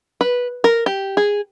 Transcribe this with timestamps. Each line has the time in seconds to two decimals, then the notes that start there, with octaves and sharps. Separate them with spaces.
0.21 B4
0.64 A#4
0.86 G4
1.17 G#4